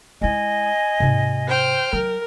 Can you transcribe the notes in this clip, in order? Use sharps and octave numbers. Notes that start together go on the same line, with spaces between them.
G#3 E4 D#5 G#5
G#2 C3
C5 G5 F6
F#3 A#4